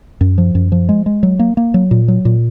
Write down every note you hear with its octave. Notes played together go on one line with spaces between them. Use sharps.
F#2
F3
F#2
F3
G#3
G#3
F#3
A#3
A#3
F#3
A#2
F#3
A#2